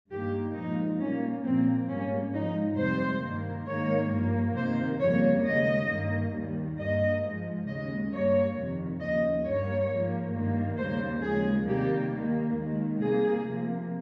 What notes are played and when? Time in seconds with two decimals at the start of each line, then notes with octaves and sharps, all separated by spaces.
0.11 G2 D#3 A#3 G4
0.55 A#2 F3 G#3 D#4
1.00 A#2 G3 A#3 C#4
1.44 A#2 F3 A#3 C4
1.88 G#2 G3 A#3 C#4
2.33 G#2 F3 G#3 D#4
2.77 F2 C3 G3 C5
3.22 G2 D#3 A#3
3.67 G#2 D#3 A#3 C#5
4.11 G2 F3 A#3
4.55 C3 D#3 A#3 C5
5.00 F2 C#3 G3 A#3 C#5
5.45 D#2 C#3 G#3 D#5
5.89 G2 D#3 A#3
6.34 D#2 D#3 G3
6.78 G2 G3 A#3 D#5
7.23 G#2 F3 G#3
7.67 D#2 C#3 G#3 D#5
8.12 G2 G3 A#3 C#5
8.57 F2 C3 D#3
9.01 D#2 C#3 F3 D#5
9.45 G2 G3 A#3 C#5
9.90 G#2 F3 A#3
10.34 G2 D#3 G3 A#3
10.78 D#2 C#3 G3 A#3 C5
11.23 D#2 C#3 F3 G#3 G#4
11.68 C3 D#3 G3 A#3 G4
12.12 D#2 D#3 A#3
12.57 D#2 D#3 G#3
13.01 C3 G3 A#3 G#4
13.45 C3 F3 A#3